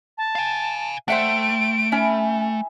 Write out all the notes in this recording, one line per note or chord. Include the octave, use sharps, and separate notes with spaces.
A5
F5 G#5
A3 C5 E5 F#5 G5 A5 D7
C#4 E5 G#5 B5